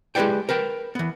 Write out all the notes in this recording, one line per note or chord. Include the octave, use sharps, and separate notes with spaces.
G#3 E4 G4 B4 D5 G5
A#4 B4 G5
E3 B3